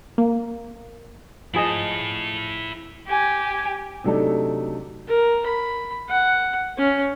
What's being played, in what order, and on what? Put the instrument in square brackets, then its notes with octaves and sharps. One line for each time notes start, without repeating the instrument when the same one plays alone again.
[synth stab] A#3
[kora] F3 G#4 D#5 [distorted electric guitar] E4 A5
[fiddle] G4 G#5
[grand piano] C3 F#3 A3 D4 D#4 A4
[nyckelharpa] A#4
B5
F#5
C#4